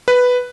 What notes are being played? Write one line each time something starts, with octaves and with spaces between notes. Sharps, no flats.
B4